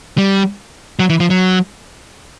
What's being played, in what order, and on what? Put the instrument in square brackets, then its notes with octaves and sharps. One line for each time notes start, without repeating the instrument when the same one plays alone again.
[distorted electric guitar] G3
F#3
E3
F3
F#3